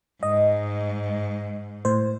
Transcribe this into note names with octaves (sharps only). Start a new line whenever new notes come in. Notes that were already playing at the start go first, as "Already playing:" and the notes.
G#2 D#5
A2 C5